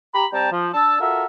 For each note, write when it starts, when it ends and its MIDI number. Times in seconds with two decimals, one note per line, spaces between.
0.15 0.26 67
0.15 0.26 82
0.15 0.26 83
0.33 0.51 55
0.33 0.51 60
0.33 0.51 79
0.33 0.51 81
0.33 0.51 82
0.52 0.68 53
0.73 1.00 62
0.73 1.00 81
0.73 1.00 88
1.01 1.26 65
1.01 1.26 66
1.01 1.26 69
1.01 1.26 70
1.01 1.26 76